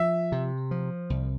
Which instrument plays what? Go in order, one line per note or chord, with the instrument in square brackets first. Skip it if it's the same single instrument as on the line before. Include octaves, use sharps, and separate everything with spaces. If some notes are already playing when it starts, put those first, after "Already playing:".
Already playing: [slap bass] F3 [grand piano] E5
[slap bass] C3
F3
C2